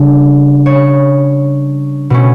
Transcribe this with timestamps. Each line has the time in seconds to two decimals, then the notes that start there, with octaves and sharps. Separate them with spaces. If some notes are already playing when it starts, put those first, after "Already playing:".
Already playing: C#3 G3 D4
0.66 C#5
2.10 B2 A3 C#4